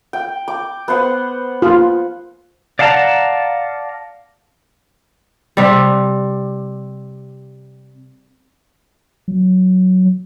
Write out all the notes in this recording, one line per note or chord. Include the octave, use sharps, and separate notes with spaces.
G5
D6
B3 C5 F#5
F4
D5 F5 F#5 A5 A#5
C3 G3
F#3